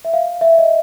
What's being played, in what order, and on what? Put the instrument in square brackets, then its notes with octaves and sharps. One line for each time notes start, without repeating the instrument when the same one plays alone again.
[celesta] E5
F5
E5
D#5